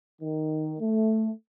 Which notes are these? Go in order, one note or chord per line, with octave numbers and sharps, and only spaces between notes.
D#3
A3